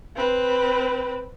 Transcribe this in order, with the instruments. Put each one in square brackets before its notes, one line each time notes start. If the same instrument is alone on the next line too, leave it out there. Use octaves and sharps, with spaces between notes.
[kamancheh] C4 B4